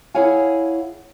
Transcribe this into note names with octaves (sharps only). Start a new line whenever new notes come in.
E4 G#4 C#5 F5 F#5 G#5